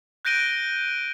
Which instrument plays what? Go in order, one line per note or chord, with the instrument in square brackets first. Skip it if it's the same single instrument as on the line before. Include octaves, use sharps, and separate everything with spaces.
[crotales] F#6 G6 A#6 D7 D#7 G7